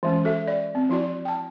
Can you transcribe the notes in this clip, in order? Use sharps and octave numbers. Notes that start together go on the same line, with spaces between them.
E3 G#3 C#4
F#4 A4 E5
D5
C4
F3 E4 F#4 D5
G5 A5